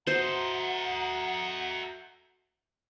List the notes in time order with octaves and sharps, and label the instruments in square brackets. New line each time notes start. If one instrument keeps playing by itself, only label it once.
[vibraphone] F#4 E5 [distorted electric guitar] A4 D#5 [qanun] C5 [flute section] F#5 A#5